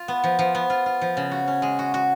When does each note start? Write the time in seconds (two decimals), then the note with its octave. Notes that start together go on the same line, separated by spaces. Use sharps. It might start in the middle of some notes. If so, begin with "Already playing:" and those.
Already playing: F4
0.08 B3
0.24 F3
0.39 F3
0.55 B3
0.70 F4
0.86 F4
1.01 F3
1.17 C#3
1.31 F#4
1.48 C#4
1.62 G#3
1.79 F#4
1.94 F#4